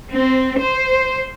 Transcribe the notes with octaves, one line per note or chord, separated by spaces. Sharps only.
C4
C5